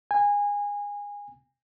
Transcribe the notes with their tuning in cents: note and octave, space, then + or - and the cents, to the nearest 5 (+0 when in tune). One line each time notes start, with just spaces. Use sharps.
G#5 -20